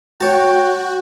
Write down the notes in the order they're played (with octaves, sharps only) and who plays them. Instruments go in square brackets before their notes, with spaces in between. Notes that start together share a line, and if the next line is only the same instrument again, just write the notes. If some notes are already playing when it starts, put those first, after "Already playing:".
[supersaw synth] F#4 [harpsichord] C#5 A5 [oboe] G5